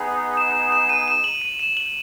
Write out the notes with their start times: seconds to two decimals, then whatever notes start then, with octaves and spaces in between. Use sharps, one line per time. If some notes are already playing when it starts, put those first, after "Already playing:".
Already playing: B3 D#4 G#4
0.37 E7
0.55 E7
0.72 E7
0.89 D#7
1.08 E7
1.24 F#7
1.42 D#7
1.59 E7
1.77 F#7